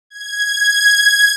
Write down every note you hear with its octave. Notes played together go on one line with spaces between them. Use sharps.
G#6